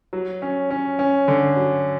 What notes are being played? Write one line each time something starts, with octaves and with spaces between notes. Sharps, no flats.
F#3
C#4
C#4
C#4
D3
F#3